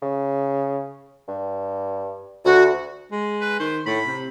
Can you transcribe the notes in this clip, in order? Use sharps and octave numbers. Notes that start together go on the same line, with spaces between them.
C#3
G2
D2 F#4
G#3
B4
D#3 C5
A2 B5
C3